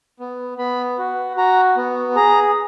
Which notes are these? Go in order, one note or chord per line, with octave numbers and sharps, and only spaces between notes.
B3
B3 B5
F#4
F#4 A#5
B3
G#4 A#5